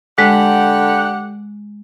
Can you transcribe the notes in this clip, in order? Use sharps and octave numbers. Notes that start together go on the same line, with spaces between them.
D3 G#3 G4 F#5